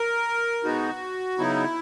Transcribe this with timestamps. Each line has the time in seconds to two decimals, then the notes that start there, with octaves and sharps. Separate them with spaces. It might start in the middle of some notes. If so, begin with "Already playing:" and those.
Already playing: A#4
0.63 B2 G#3 B3 D#4 F#4
1.38 C#3 F#3 B3 D#4 E4